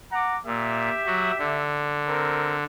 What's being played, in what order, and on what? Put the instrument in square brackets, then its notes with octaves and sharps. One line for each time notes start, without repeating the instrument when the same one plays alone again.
[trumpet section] F#5 A#5 D6
[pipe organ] A#2 [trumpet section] G4 E5
[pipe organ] F#3 F#4
D3
[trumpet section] C4 A#4